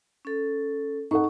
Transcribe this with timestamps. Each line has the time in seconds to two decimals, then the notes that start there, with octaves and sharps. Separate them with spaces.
0.25 C#4 A4
1.11 D#4 A4 F#5 C#6